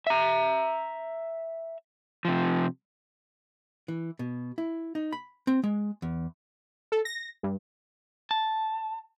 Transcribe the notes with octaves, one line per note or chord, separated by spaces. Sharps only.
E5 A#5
C3 F3
E3
B2
E4
D#4
B5
C4
G#3
E2
A4
A#6
G2
A5